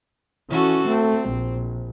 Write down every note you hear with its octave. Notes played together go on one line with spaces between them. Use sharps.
E3 C#4 F#4 A4
A3 C4
A#1